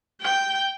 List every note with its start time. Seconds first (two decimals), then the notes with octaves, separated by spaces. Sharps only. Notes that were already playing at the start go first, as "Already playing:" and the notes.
0.22 G5